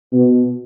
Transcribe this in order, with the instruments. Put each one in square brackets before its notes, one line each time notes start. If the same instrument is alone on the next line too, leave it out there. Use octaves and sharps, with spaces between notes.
[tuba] B2